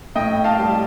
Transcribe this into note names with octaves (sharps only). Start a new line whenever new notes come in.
A2 D#5 G5
F5 A5
G3